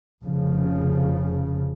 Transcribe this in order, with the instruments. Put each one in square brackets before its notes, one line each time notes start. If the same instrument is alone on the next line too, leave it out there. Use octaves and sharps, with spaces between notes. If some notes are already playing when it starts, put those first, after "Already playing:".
[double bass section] F1 C#3 F3